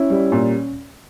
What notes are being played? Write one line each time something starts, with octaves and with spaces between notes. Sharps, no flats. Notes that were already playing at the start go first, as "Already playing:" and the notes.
Already playing: C#4 E4
G3
A#2